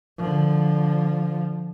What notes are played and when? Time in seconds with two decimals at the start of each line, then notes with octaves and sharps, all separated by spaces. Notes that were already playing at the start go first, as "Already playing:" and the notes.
0.18 D3 F3